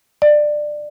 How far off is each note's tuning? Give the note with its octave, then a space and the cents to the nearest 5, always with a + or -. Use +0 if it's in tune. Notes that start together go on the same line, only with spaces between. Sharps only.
D5 +20